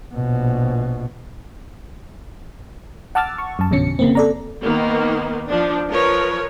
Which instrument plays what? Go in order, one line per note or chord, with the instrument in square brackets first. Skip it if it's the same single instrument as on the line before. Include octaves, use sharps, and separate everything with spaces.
[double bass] A#1 B2
[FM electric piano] F#5 A5 D6 E6 F6 A6
C#6
F#2 A5
A1 F2 B2 D3 C#4 C#7
C#3 A#3 C4
A4 D5 A#5
[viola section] D#3 A#3 B3
F3 D4
F3 A#4 B4 C#5